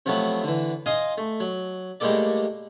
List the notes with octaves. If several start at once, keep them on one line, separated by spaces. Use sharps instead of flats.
C3 F3 F#3 A3 B3
D3 E3
D#5 F5 G#5 C6 D#6
A3
F#3
A2 G3 G#3 A#3 A4 D5